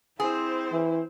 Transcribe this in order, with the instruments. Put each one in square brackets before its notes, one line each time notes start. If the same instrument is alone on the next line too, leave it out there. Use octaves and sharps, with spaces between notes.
[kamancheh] C4 C5 [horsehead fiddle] E4 [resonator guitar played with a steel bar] G#4
[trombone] E3